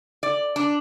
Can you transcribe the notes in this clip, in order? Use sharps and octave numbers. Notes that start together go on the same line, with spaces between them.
D5
D4